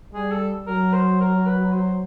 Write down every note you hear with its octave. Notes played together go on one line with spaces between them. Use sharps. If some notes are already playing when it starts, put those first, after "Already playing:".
G3 G#4
A4
F#3 A#4
C5
A#4
B4
C5